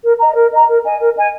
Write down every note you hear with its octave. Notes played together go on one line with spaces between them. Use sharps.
A#4
D#5 A#5
A#4
D#5 A#5
A#4
D#5 G#5
A#4
D#5 G#5